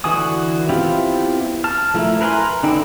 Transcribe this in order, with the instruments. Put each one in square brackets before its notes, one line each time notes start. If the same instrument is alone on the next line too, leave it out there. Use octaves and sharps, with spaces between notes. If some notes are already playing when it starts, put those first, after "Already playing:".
[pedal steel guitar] D3 E3 F#4 G#5 D#6
B3 C4 E4 F4 G4
A5 F6
F3 A3 E4 A#4
A#4 B4 E5 G#5 C6
D3 D#4 E4 G5